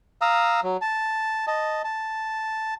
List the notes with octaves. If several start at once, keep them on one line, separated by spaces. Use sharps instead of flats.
F5 A#5 D#6 E6
F#3
A5
D#5 A5
A5